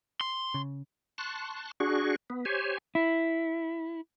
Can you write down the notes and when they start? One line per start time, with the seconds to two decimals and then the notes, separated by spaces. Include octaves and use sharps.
0.21 C6
0.54 C#3
1.18 A5 C6 C#6 F#6
1.80 D4 F#4 G#4 C#6
2.30 B3
2.45 G4 C5 C#5 G#5
2.95 E4